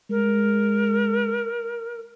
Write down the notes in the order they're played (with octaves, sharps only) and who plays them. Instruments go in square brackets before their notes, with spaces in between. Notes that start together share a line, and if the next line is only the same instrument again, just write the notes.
[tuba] G#3 [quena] A#4